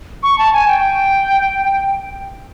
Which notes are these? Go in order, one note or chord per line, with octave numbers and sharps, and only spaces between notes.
C#6
A5
G#5
G5